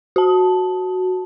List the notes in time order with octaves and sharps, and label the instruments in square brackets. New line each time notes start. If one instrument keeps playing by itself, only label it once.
[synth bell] F#4 A5